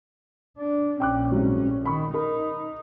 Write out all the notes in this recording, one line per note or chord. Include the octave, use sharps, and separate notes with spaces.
D4
A#1 C#4 G5 D6 F#6
C2 G#2 F#3
D#3 B5 C#6
D#4 A#4 B5